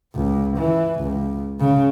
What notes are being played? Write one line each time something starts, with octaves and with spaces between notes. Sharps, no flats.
C#2
E3
C#2
C#3